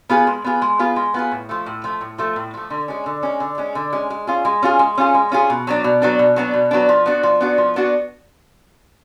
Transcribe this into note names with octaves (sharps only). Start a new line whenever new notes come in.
B3 F4 G#4
G#3
B3 F4 G#4
G#3
B3 F4 G#4
G#3
B3 F4 G#4
A2
F3 A3
A2
F3 A3
A2
F3 A3
A2
F3 A3
D3
G#3 C#4
D3
G#3 C#4
D3
G#3 C#4
D3
G#3 C#4
G#3
C#4 F4 G#4
G#3
C#4 F4 G#4
G#3
C#4 F4 G#4
G#3
C#4 F4 G#4
B2
F#3 B3 D4
B2
F#3 B3 D4
B2
F#3 B3 D4
B2
F#3 B3 D4
F3
B3 D4 F#4
F3
B3 D4 F#4
F3
B3 D4 F#4